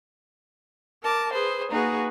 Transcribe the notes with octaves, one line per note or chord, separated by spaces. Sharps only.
A#4 A5 D6
G#4 B4 C5
A#3 D#4 F#4 G#4 B4